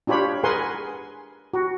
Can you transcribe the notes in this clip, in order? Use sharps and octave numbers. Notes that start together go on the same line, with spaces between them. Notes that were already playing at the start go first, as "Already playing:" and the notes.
D4 F4 G4 C#5 B5
G#4 A#4 B4 F#5 G#5 C6
F#4